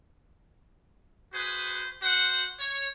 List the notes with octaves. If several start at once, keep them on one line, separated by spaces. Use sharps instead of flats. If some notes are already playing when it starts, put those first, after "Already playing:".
F#4 G#4 B4 C5
F#4 C5 F#5
C#5